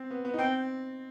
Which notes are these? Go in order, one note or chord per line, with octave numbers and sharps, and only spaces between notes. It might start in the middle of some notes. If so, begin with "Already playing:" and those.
Already playing: C4
B3
B3
D#4
C4 G5